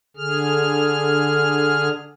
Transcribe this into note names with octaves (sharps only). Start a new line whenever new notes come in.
D3 G#4 F6